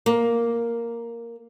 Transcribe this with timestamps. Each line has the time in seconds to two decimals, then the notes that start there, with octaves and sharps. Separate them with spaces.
0.06 A#3